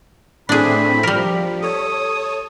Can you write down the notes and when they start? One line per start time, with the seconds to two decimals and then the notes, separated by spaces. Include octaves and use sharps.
0.49 A2 A3 C4 D4 G#4 B5
1.03 F3 G3 A#4
1.62 A4 C#5 D#6